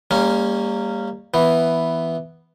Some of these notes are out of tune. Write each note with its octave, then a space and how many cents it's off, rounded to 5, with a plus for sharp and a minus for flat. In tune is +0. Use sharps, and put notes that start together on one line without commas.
G3 +30 A#3 -15 C#4 +0
E3 +0 B3 +0